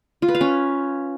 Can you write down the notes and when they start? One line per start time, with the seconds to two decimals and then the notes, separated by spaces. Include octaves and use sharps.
0.22 F4
0.28 B4
0.35 F5
0.41 C#4